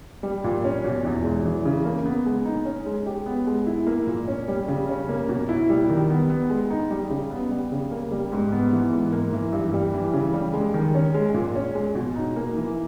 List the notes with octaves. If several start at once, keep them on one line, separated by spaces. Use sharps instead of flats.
G3
A#2
C#4
B2
E2
G#3
E3
C#3
A#3
B3
G#3
D#4
C#4
G#3
G4
B3
G#3
E4
A#3
A#2
C#4
G3
C#3
C#4
A#3
B2
E4
G3
D#3
B3
B3
G#3
D#4
G3
C#3
B3
G3
C#3
A#3
G3
G#2
B3
E3
G#2
A#3
E3
G2
G3
E3
C#3
G3
G#3
D#3
C#4
G#3
A#2
C#4
G#3
B2
D#4
A#3
E3